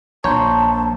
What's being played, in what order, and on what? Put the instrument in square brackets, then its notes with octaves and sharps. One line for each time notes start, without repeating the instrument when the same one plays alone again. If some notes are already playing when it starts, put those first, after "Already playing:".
[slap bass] A#1 [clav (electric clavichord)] C#5 [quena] A5 [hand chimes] A#5 C6 G6